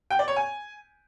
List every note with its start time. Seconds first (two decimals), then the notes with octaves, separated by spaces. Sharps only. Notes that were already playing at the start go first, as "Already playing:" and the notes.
0.11 G5
0.19 D5
0.28 C#5
0.36 G#5